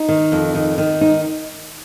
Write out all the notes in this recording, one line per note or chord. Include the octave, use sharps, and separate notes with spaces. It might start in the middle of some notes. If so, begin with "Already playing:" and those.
Already playing: D#4
D#3
F2
D#3
D#3
D#4